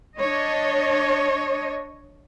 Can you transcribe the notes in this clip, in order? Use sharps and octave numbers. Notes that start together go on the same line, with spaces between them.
D4 C#5 D#5